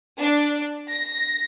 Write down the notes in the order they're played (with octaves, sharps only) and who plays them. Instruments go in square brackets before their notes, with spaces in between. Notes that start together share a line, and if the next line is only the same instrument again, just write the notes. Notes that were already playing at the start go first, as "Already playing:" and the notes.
[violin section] D4
A#6